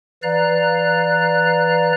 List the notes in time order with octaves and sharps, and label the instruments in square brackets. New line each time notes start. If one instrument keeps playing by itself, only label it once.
[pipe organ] E3 B4 D5 F5 A#5 F#6